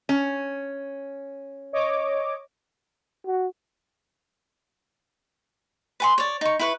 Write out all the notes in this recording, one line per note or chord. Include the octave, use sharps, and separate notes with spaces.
C#4
C#5 D#5 D6
F#4
B4 G#5 C6
C#5 D5
D#4 C#6
E4 B4 C#6